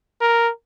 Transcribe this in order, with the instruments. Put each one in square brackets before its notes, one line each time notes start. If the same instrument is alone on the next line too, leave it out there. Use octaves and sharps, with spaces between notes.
[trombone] A#4